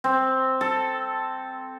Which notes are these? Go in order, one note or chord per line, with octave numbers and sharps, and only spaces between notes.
C4
A4